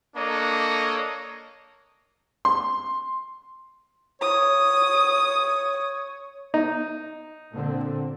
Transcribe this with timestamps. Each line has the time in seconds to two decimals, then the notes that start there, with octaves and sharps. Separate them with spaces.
0.16 A#3 D4 A4 C#5 D#5
2.45 C6
4.21 C#5 D#6
6.54 D#4
7.51 A#2 D3 C4